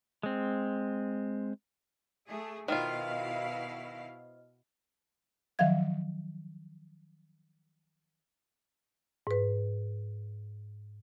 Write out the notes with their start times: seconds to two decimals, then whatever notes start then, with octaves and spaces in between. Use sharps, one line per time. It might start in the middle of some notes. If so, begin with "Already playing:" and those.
0.23 G#3 C4
2.26 A3 G#4
2.68 B2 D#3 E4 F4 C5 D#5 F5 F6
5.59 D#3 F3 F#3 E5 F5 G#6
9.27 G#2 B4